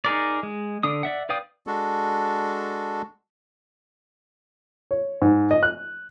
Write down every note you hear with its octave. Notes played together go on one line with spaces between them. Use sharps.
D#4 G#4 A#4 D5
G#3
D3 D4 D#6
D5 E5 F#5
B4 D5 F5 G5 D#6
G#3 D4 F#4 A4
C#5
G#2
D#5
F#6